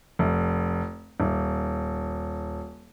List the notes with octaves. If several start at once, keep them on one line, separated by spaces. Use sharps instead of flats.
F1
D#1